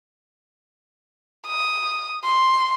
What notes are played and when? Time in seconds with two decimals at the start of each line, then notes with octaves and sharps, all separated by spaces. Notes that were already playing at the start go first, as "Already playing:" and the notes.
1.47 D#6
2.24 C6